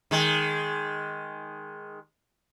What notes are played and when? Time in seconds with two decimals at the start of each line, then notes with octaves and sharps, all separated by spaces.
0.11 D#3 G#3